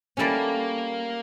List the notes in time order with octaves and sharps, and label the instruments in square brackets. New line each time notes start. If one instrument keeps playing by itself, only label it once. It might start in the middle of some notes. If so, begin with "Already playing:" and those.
[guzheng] G3 C#4 E4 A4 D5 [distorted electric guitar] A#3